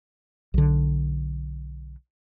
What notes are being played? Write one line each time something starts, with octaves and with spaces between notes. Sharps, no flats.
B1 D3